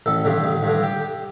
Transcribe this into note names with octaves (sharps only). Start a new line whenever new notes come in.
A1 A4
G2 D3
A1
G2 D3
G4